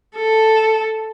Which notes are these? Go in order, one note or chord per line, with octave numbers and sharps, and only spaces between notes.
A4